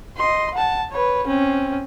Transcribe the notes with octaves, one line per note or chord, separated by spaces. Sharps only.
D#5 C6
F#5 A5
B4 C#5
C4 C#4